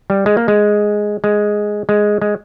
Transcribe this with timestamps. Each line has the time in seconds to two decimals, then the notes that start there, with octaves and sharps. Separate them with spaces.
0.10 G3
0.26 G#3
0.37 A#3
0.48 G#3
1.24 G#3
1.89 G#3
2.22 G#3